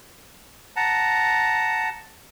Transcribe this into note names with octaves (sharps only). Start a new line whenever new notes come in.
F#5 A5 A#5